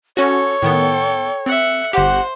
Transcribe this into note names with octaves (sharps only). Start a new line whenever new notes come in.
C#4 F#4 A4 C#5
A2 D#3 B3 A4 G5
C4 E5 F#5
G1 G4 C5 F#5